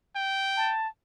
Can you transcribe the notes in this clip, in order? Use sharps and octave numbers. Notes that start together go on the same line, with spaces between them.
G5
A5